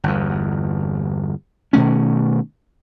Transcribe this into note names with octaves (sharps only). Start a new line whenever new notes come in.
G1 E2
B2 D#3 A3 C#4